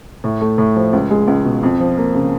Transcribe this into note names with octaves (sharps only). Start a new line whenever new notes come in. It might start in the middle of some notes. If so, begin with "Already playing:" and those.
A2
A3
A2
F3
C#2
G#3
C#2
B2
F2
F3
A#3
C#3